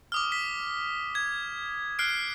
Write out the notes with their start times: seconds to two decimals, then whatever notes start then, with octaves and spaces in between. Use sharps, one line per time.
0.12 D6 D#6 F6
0.32 B6
1.15 G#6
1.99 F6 F#6 C7 D7